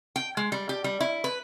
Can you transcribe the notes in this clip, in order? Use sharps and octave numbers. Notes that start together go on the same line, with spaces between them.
G5
G#3
G3
G4
G3
E4
B4